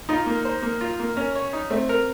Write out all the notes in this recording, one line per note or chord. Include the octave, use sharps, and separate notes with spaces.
D#4 F4
A#3
C5
A#3
F4
A#3
C#4 A#4
C#5
D#4
A3 C4
A#4